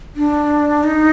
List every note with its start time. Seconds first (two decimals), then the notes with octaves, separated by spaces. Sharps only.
0.16 D4
0.84 D#4